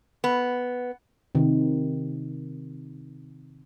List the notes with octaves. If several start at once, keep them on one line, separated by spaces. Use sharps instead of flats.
B3
C3 D#3